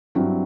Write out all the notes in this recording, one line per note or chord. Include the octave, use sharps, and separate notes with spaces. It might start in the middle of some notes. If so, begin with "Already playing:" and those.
G2 F#3 C4 E4